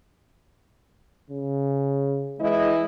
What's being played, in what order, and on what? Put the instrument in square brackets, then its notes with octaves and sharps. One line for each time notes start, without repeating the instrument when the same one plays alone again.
[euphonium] C#3
[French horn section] E3 E4 D#5 [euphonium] G#3